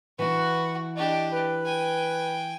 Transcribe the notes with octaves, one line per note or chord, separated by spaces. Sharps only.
E3 E4 F#4 B4
D4 G4 D#5
B4
G5 G#5